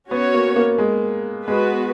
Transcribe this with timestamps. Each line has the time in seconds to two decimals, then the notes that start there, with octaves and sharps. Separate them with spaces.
0.11 B3 C#4 F#4 C#5
0.34 A#3
0.56 A#3
0.78 G#3
1.47 G#3 B3 F#4 B4